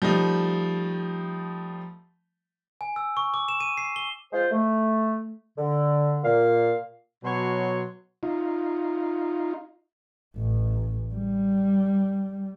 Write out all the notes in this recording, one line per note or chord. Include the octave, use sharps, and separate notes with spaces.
F3 G3 A3 D#4
G#5
E6
C#6
D6
E7
D#7
C7
G7
G#3 F4 C5
A3
D3
A#2 F5
B2 F#3 C#5 C6
D#4 F4
A1
G3